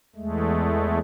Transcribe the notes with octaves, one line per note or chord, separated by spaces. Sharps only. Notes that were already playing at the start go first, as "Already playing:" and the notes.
E2 G#3 A3